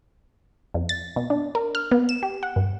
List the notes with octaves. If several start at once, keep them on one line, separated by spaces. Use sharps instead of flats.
F2
A6
B2
D4
A#4
F6
B3
E7
G4
F#5
G2